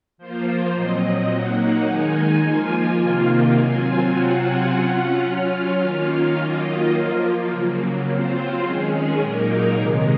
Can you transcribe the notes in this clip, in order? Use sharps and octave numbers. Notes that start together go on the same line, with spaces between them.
F3 A#3 F4 C5
A#2 F#3 C4 D#5
F#3 A#3 D#4 F#5
D#3 G#3 D#4 G#5
F3 A#3 F4
C3 D#3 A#3 F4
F#3 C4 F4 G#5
C3 F#3 C4 F4 F#5
G#5
F#3 C#4 F4 F#5
F#3 C#4 F4 F5
D#3 A#3 C#4 F4 F5
D#3 F#3 A#3 F4 D#5
F3 A#3 F4
C#3 F#3 A#3
F#3 C4 F4 C5
D#3 G#3 C#4 G#4
A#2 F#3 A#3 D#4 A#4
C3 D#3 G#3